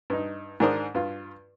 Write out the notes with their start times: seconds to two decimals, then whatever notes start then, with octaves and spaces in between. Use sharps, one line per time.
0.10 G2 D#4
0.60 G#2 D#3 D4 A#4 C5 D#6
0.95 G2 F4